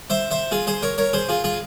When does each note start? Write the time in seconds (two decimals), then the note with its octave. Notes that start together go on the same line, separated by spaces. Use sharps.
0.10 C5 E5
0.31 C5 E5
0.51 F4 G#4
0.67 G#4 C5
0.82 A#4 C#5
0.98 A#4 C#5
1.13 G#4 C5
1.29 F4 G#4
1.44 F4 G#4